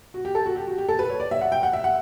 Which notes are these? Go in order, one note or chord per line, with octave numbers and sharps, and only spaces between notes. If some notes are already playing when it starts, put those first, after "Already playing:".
F#4
G4
A4
F#4
G4
F#4
G4
A4
B4
C#5
D5
E5
F#5
G5
F#5
E5
F#5